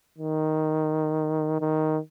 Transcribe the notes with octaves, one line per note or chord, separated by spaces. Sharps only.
D#3
D#3